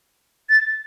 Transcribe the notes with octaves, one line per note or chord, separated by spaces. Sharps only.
A6